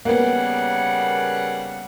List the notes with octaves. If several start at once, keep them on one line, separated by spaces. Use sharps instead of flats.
C#3 G3 A#3 B3 F#5